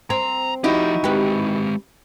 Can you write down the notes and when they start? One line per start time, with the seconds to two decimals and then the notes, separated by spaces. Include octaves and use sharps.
0.10 C4 A#5
0.64 F3 D#4 E4 F#4 G4
1.04 G#3 C4 G4 B4